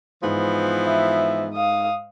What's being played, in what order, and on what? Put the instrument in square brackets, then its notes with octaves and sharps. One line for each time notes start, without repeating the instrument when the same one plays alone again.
[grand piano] G#2 [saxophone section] E3 F3 B3
[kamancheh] E5
F5 D#6